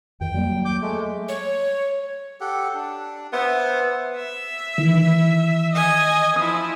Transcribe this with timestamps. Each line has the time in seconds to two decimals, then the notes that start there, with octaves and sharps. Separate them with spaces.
0.21 F2 D#3 G5
0.34 F#3 G3 A#3
0.65 D6 G6
0.82 G#3 A3
1.29 C#5
2.41 G4 A4 F#5
2.74 D4
3.33 B3 C5 E5
4.16 E5
4.78 D#3 E3
5.72 D#5 G#5
6.36 F3 E4 D#6